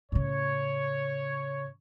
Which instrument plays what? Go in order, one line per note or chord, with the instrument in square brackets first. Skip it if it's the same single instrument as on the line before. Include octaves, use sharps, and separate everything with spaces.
[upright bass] A2 C#3 [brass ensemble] C#5